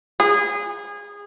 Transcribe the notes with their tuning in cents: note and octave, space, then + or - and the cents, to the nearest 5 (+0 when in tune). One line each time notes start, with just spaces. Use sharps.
G#4 -25